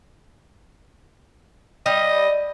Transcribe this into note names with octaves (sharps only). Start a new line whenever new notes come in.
G3 D#5